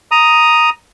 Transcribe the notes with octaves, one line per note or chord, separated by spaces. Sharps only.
A#5 D#6